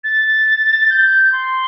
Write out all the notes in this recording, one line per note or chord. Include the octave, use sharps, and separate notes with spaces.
A6
G6
C6